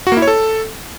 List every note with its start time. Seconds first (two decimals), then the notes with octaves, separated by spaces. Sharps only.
0.07 F#4
0.12 A#3
0.17 E4
0.22 C#5
0.27 A4